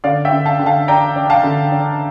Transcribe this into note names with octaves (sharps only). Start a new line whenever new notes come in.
D3 D5 F5
E5 G5
D3
F5 A5
D3
F5 A5
D4 G5 A#5
D4
F5 A5
D3
D4